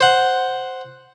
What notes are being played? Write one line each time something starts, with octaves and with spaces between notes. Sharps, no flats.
C5 F#5